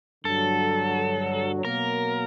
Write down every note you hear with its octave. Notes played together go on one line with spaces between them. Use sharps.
G2 D3 F#3 A4
B2 F#3 A#3 A#4